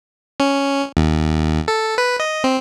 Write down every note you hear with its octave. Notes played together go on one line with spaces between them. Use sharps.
C#4
D#2
A4
B4
D#5
C4